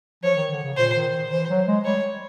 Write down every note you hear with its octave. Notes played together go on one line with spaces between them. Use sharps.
F3 C#5
D#3
D3
C#3
A#2 C5
D#3
D#3
E3 C5
F#3
G#3
G3 C#5